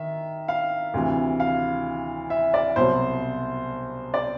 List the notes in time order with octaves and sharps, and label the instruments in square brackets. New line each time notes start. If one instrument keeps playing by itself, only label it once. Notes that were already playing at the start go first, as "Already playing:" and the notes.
Already playing: [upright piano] D#3 E5
F5
D2 C3 E3
F5
E5
D5
C2 B2 F#3 C5
D5